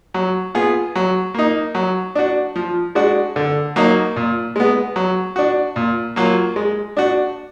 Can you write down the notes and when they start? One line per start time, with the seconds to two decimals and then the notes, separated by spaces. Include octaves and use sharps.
0.14 F#3
0.55 B3 F4 G#4
0.95 F#3
1.35 A#3 D#4
1.75 F#3
2.15 D4 F#4
2.56 F3
2.95 G#3 D4 F#4
3.36 D3
3.76 F#3 A#3 D#4
4.16 A#2
4.56 G#3 B3
4.96 F#3
5.36 D4 F#4
5.76 A#2
6.16 F#3 A#3 F4
6.56 G#3
6.97 D4 F#4